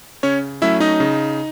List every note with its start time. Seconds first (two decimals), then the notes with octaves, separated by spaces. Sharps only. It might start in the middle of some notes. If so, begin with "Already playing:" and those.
0.23 C#3 C#4 C#5
0.62 F#3 A3 C#4 E4 E5
0.80 D#4 D#5
1.00 C#3